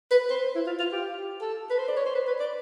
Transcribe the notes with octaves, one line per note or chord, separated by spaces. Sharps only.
B4
C5
E4
F4
F4
G4
A4
B4
C5
D5
C#5
C5
B4
B4
D5